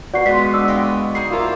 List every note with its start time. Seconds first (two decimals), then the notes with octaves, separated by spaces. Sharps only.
0.14 F#4 B4 D5 B5 C7
0.26 A#2 G#3 B3 F4 B6
0.54 D4 E6
0.68 D#5 F5 G5
1.15 D#4 G#4 C7
1.30 A#3 E4 F4 A#4 C5 E6